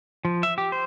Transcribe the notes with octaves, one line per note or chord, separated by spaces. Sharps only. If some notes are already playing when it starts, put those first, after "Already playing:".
F3
E5
G4
C5